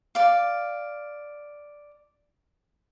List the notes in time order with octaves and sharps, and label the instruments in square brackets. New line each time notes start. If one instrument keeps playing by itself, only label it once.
[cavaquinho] D5 F5